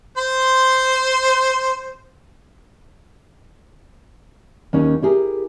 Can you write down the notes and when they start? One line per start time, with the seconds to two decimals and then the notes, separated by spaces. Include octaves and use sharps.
0.17 C5 C6
4.73 D#2 C#4 D#4
5.02 E4 G4 G#4 A#4